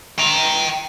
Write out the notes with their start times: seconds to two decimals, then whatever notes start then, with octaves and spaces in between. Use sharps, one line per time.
0.18 G5 A#5